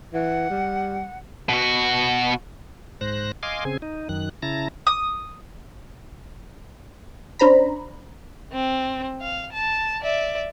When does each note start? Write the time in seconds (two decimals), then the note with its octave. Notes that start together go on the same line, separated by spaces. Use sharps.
0.14 E3 F#5
0.50 G3
1.49 B2 F#4
3.01 G#2 C5 F#6 A#6
3.43 D#5 F5 G#5 C6 D6
3.65 C#3 C4 G#4 G#5
3.82 D#4
4.09 F#2 D#3 F#6
4.43 C#3 E4 A5 A#5 A#6
4.87 D#6
7.39 C#4 D4 C5 A#5 B5
8.53 C4
9.21 F5
9.53 A5
10.02 D5 E5